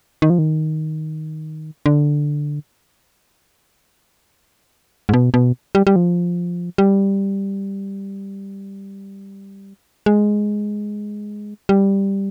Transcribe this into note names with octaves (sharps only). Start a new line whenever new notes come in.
D#3
F3
D#3
D3
G#2
B2
B2
G3
G3
F3
G3
G#3
G3